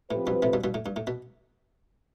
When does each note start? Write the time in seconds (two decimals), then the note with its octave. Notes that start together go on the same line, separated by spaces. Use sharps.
0.10 A2 F3 C4 G4 B4
0.27 G2 B2
0.42 A2 C3
0.53 G2 B2
0.64 G2 B2
0.74 A2
0.86 G2
0.96 A2
1.07 B2